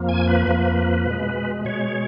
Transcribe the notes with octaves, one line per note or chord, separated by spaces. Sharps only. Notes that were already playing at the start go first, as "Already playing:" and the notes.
Already playing: F2 F3 A#3
G#5
B4
F2 F3 A#3
B2 G#3
B2 G#3 C#5